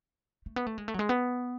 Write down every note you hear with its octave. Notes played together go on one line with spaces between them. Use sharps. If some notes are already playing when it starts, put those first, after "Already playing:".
A3
B3
A3
G#3
A3
F#3
G#3
B3